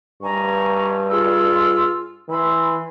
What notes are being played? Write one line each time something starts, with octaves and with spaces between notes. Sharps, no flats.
G2 G#5 A#5 C#6
F4 G#4 E6
E3 B5 C6 E6